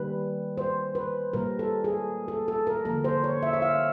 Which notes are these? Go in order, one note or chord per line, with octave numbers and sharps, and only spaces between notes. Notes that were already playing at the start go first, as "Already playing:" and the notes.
Already playing: D#3 G3 A#3 B4
C5
B4
A#2 G3 A#3 A#4
A4
G#4
A4
A4
A#4
D3 F3 A#3 A#4
C5
C#5
E5
E5
F5